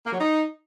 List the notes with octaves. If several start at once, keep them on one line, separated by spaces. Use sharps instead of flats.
A#3
F#3
D#4